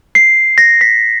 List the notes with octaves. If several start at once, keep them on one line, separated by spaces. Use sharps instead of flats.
C7
A#6
B6